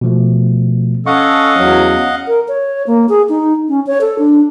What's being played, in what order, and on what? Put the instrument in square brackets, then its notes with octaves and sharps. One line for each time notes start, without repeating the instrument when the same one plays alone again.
[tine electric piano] B2 F3 A3
[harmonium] C#4 A4 [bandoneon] D#5 F5 F#5 [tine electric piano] C#6
[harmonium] E2 F#3 [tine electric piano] C#4 C#5
[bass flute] A#4
C#5
A#3
G#4
D#4
C#4
C#5
A4
D4